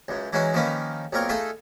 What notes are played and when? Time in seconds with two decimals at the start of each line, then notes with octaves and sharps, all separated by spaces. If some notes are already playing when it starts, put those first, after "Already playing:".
0.08 C#2 F#2
0.33 E3 F#3 G#3 C#4 D#4 F#4
0.54 D#3 F3 A#3 C#4 D#4 B4
1.13 B1 A#2 C4 A#4 C#5
1.29 A3 D#4 F4 G#4 A4